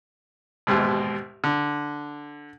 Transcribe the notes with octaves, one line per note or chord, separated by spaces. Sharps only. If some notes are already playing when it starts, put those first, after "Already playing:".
A1 D#2 G#2 B2
D3